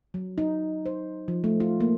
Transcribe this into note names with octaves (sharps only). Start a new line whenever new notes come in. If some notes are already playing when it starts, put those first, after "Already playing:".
F#3
D#4
C5
F3
A3
F4
A#3